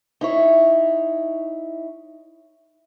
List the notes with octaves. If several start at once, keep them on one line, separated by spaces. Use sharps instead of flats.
D#4 E4 C#5